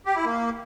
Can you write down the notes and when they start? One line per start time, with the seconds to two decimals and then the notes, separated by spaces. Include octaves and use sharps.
0.06 G4
0.16 E4
0.25 A#3